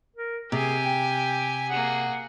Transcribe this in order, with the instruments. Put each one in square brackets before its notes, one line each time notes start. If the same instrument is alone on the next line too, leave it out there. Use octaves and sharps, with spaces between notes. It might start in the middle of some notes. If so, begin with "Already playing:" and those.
[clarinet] A#4
[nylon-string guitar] C3 [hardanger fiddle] G4 G#5 [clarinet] G#4
[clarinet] G5
[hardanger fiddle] A#3 G#4 [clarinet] F#5